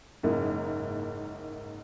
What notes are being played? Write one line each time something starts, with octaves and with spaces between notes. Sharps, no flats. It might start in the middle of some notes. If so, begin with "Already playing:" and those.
F#1 G#2 A#3 E4